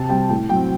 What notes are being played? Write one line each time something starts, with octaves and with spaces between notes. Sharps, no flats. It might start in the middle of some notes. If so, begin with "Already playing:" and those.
Already playing: C3 A5
G3 C4 G5
A2 G5
F#3 C4 G5